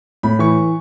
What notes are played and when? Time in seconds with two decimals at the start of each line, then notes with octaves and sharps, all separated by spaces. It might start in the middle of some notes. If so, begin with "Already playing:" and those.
0.23 A2 B5
0.39 E3 C#6